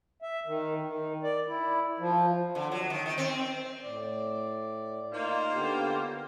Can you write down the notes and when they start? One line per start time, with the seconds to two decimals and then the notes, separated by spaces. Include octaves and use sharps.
0.22 E5
0.47 D#3
0.84 D#3
1.23 D5
1.48 E4
1.99 F3
2.55 D3
2.72 F#3
2.90 D#3
3.06 D#3
3.18 C4
3.83 A2 D5
5.12 A#3 D#4 F4 C5
5.53 D3 B3 G4